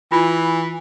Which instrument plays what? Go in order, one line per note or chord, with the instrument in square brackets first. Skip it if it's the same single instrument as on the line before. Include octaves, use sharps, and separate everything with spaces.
[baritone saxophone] E3 [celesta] F4 B5